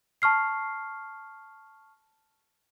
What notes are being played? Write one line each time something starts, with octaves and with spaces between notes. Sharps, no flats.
A5 C#6 F6 C7